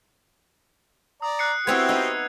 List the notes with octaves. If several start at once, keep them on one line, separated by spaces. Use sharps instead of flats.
D5 A#5 D#6
F#6 C7 C#7
B3 C4 E4 F#4 G4 C5 G#6 F7
B3 D#4 E6